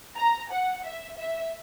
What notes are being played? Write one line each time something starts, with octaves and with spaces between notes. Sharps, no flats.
A#5
F#5
E5
E5